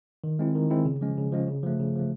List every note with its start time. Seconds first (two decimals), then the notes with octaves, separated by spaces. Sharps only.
0.24 D#3
0.39 G#3 C4 E4
0.55 D#3
0.71 G#3 C4 E4
0.85 C#3
1.01 F3 G#3 C#4
1.17 C#3
1.32 F3 G#3 C#4
1.48 C#3
1.63 F3 A3
1.80 C#3
1.96 F3 A3